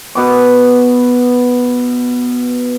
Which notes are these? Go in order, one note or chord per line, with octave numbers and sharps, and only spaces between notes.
B2 B3 D6